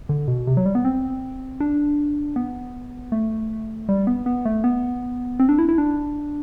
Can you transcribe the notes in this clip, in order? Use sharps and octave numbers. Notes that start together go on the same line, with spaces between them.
D3
B2
C3
F#3
G3
B3
C4
D4
B3
A3
G3
B3
B3
A3
B3
C4
D4
E4
E4
D4